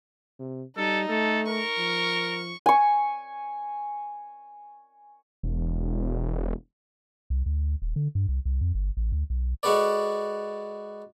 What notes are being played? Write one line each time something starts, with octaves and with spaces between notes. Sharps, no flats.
C3
G3 D#4 A4
A3 A4
A#4 C#6
F3
G#5 C#6
E1
C2
D2
D#1
D3
G2
C2
C2
F2
G1
A1
D2
B1
G#3 F#4 A4 B4 D5